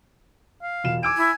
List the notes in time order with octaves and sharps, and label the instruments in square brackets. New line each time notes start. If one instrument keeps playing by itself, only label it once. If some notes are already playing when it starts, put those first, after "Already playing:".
[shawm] F5
[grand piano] E1 F4 E7
[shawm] G#5 [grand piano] D6 E6 D7
[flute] E4